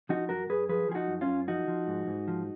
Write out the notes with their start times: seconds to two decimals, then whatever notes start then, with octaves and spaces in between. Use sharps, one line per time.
0.09 F3 D#4 F#4
0.29 F#2 F#4 A#4
0.50 F#2 G#4 B4
0.69 F3 G#4 B4
0.89 F3 G#4
0.95 D#4 F#4
1.08 F#2
1.21 C#4 F4
1.28 F#2
1.48 F3 D#4 F#4
1.68 F3
1.87 G#2
2.07 G#2
2.28 F3